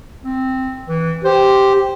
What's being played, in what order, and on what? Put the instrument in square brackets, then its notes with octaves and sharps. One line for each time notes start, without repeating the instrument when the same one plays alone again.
[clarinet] C4
E3
[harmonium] G4 [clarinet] C5